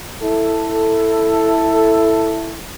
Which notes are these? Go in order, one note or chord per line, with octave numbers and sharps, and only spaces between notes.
E4 A4